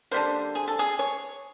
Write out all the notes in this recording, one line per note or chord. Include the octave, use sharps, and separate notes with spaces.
D3 G3 A#3 C5
G#4
A4
G#4
C#5